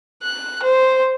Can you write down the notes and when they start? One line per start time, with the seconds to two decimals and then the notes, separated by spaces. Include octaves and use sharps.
0.23 F#6
0.63 C5